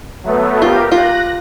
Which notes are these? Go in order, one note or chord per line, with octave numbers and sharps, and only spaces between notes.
F#3 A3 B3
F4 G4 A#4
F4 F#6 A#6